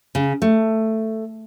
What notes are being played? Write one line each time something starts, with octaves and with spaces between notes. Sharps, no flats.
C#3
A3